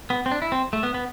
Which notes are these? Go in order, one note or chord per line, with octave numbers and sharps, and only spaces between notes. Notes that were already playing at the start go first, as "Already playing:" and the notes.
B3
C4
D4
E4
C4
A3
B3
B3